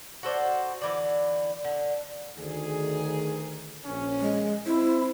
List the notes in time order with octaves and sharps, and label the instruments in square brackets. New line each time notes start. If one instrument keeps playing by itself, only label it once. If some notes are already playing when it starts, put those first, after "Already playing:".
[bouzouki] F#4 A4 C5 D5
D3 E3 D5
D3
[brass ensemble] D2 D#3 G#4
A#1 C#4
[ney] G#3
[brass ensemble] C4 C5 [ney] E4